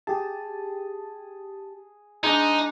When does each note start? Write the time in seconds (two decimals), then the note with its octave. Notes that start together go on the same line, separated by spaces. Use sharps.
0.07 G4 G#4 A5
2.24 G#3 D4 D#4